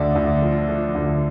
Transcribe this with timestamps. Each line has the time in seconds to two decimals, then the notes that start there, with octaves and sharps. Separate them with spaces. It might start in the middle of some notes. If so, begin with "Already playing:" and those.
Already playing: D2 D3 D5 E5
0.15 D2
0.42 F3
0.69 F3
0.95 D2